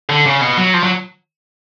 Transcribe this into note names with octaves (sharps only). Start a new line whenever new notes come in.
D3
C#3
B2
F#3
F3
F#3